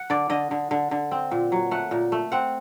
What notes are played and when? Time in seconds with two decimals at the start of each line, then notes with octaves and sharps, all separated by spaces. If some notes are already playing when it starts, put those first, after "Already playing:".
Already playing: F#5
0.10 D3 D5
0.30 D3 D#5
0.51 D3
0.71 D3
0.91 D3
1.11 C4
1.31 A#2
1.52 F#3
1.71 A3 F#5
1.91 A#2
2.12 A3
2.32 C4 F#5